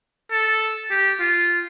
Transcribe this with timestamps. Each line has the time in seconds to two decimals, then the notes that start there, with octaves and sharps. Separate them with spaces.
0.32 A4
0.91 G4
1.20 F4